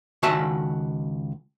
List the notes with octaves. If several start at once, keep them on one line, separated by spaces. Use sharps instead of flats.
C#2 D#3 F#4 E5 G#5 A5